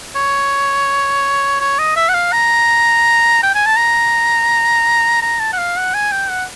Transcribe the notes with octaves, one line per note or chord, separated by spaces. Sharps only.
C#5
C#5
D#5
E5
F#5
F5
A#5
G5
G#5
A5
A#5
A#5
A5
F#5
F5
F#5
G#5
G5
F#5